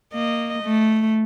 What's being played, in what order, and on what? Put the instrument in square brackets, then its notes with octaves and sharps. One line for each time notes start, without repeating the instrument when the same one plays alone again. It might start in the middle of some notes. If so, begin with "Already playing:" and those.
[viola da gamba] A#3 D#5
A3